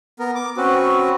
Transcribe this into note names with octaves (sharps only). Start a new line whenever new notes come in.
B3 A#4
D6
C4 C#4 F#4 B4